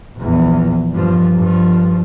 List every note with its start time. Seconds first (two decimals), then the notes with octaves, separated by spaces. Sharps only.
0.18 A#1 E2
0.93 G2 F3
1.36 G2 F3